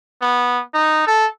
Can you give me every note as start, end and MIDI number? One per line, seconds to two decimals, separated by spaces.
0.22 0.61 59
0.74 1.03 63
1.07 1.27 69